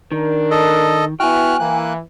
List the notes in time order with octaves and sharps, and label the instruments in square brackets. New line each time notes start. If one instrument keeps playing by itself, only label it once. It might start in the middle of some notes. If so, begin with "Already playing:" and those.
[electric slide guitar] D#3 [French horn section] D4 A#4
[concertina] A4 D#5
[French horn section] B3 E4 [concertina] F#4 F6 F#6 [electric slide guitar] G5 G#5
[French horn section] E3 [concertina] A#3 F#6